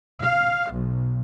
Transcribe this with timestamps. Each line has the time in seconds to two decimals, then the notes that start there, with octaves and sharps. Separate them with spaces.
0.21 F5
0.72 B1